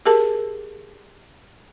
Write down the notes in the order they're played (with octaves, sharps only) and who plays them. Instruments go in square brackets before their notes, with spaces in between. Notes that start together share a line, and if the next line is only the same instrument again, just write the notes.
[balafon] G4 G#4 A#4 A5